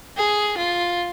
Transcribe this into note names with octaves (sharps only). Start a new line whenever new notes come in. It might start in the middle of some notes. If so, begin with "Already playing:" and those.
G#4
F4